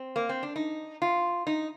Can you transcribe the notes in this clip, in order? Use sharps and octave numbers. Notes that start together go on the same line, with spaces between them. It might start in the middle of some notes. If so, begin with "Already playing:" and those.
Already playing: C4
A#3
C4
D4
D#4
F4
D#4